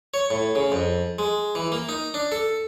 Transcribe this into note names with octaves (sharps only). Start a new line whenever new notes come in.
C#5
A2
C#3
F2
G#3
E3
A#3
D#4
D4
A4